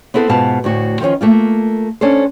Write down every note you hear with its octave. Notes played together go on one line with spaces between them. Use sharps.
B3 C4 E4 A4 B4 C5
G#2 B2 B3 F4 F5 A5
D2 A2 F#4
D#3 F3 C4 C#4 F4
A3 A#3 F4
C#4 D4 A4 C5